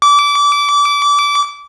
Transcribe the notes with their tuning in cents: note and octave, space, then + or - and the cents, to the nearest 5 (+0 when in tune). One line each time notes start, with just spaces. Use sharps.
D6 -25